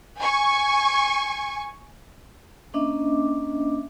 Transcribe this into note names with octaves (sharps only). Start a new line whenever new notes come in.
G#5 C#6
A#3 C#4 D4 D#5 E5 D6